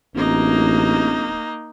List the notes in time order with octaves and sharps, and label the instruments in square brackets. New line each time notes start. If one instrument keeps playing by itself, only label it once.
[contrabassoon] D1 [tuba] A1 [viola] A#3 D#4